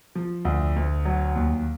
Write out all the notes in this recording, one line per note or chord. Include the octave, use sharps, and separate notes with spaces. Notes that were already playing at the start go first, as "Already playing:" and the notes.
F3
D2
D2
F#3
D#2